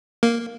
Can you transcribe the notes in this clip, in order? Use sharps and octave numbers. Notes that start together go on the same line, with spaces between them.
A#3